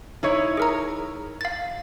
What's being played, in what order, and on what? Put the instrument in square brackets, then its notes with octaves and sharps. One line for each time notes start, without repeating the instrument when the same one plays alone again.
[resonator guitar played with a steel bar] D#4 E4 C#5
[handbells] G#4 A#4 A#5
F5 A6